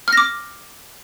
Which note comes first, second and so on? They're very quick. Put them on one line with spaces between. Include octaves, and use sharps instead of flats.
F6 A#6 D6